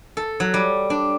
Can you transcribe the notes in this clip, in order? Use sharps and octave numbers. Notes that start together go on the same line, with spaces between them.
A4
F#3
G3
D4